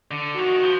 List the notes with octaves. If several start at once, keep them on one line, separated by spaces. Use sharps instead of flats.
D3
D#3 F#4
F3